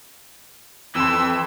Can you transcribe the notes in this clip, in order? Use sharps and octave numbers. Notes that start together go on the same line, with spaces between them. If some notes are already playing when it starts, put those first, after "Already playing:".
F2 E3 C6 E6